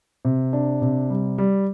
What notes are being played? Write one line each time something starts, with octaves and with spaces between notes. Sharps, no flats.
C3
D4
C3
G3
G3